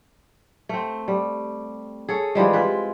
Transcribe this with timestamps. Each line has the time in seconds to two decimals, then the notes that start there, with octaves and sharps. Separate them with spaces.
0.69 A3 C4
1.08 G3
2.08 G#4 A4 C#5
2.35 E3 F3 G3 G#3
2.53 C4 E4 F4 B4